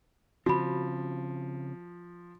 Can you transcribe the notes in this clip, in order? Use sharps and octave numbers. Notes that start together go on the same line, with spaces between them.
C#3 F3 C4 F#4 B5